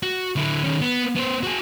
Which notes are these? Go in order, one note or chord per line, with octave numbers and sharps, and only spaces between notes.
F#4
D3 E4
D#3 C#4
B3
B3 C5
F#4 G#4